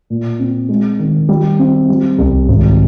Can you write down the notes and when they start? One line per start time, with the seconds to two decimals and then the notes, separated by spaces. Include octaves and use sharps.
0.10 A#2
0.39 C4
0.69 G#3
0.99 D#3
1.29 G3
1.59 C4
1.89 G3
2.18 C2
2.48 G#1